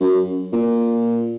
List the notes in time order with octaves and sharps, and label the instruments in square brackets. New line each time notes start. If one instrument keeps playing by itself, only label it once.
[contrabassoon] F#2
A#2